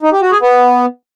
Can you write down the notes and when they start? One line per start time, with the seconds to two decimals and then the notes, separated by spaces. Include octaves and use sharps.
0.03 D#4
0.12 G4
0.22 F#4
0.31 G#4
0.41 B3